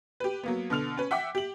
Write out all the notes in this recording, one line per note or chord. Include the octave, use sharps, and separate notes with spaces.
G4 B4
F#3 A#3 B3
B2 D3 F6 F7
C#4 B4
E5 F#5 G5 D6 B6
G4 F#7